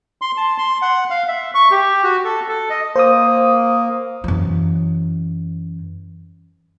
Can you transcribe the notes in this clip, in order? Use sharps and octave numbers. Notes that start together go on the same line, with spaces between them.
C6
A5
C6
F#5
F5
E5
C#6
G4
F#4
A4
A4
D#5
A#3 C5 D#6
F#2 E3